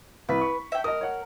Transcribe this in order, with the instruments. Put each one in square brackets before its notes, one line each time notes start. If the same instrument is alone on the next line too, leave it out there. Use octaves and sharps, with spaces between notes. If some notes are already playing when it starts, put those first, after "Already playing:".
[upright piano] C2 B6 [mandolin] B4
[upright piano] C#6
[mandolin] E5 G5
[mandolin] A#4 [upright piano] D#5 D#6
[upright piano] C#5 F#5